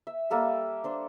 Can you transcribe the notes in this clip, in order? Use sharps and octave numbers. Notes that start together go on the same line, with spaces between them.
E5
G3 A#3 A4 E5
D4 C5